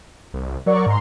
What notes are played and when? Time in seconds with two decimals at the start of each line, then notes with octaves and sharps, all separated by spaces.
0.34 C2
0.66 F#3 A#4 D5 C#6
0.86 G#2 A#5 C6